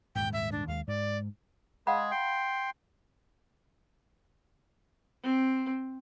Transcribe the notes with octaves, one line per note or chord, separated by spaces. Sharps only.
D#1 G#2 G5
E5
D4
D#2 G3 G#3 F5
G#2 D5
G#3 G#4 F5 F#5 B5
G5 C6
C4